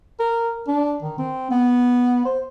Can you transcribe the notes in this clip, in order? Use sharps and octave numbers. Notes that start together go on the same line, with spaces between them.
A#4
D4
D#3
C4
B3
C5